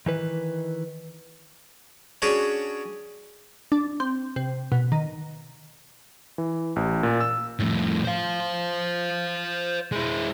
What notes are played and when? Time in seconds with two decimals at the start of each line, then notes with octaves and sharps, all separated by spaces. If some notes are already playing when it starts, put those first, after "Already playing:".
0.06 D#3 E3 B4
2.22 C#4 D4 F#4 G#4 C#5
3.72 D4
4.00 C4
4.36 C3
4.72 B2
4.92 D#3
6.38 E3
6.76 A1
7.03 A#2
7.20 E6
7.59 F2 A2
8.04 C5 F5
9.92 G#3 E4